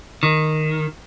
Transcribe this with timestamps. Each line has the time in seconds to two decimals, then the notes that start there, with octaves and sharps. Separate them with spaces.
0.23 D#3